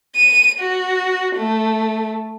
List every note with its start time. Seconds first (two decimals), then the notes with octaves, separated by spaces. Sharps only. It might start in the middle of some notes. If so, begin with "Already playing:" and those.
0.16 D#7
0.60 F#4
1.37 A3